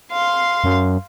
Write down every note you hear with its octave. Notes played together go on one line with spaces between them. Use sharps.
F5 C6
F#2